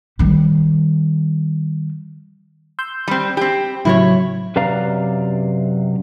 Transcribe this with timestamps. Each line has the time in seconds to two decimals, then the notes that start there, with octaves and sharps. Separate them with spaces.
0.19 D#3 G3
2.79 C6 E6 G6
3.08 G3 C4
3.37 C4 G4 B5
3.85 A2 C#3 F#3 E4 C5 C#5
4.56 F#2 C3 B4 D5 F5 A#5